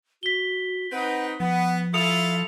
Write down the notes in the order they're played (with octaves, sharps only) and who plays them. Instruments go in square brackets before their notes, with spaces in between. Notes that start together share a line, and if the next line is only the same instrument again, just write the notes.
[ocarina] F#4 [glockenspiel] B6 G7
[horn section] C4 D#4 B4 [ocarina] F#5
[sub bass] F3 [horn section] B3 [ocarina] F#5
[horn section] E4 F4 A4 [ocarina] E5 [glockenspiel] D#6 C#7 F7